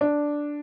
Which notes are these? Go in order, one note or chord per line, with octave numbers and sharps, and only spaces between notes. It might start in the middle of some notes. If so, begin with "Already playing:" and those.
D4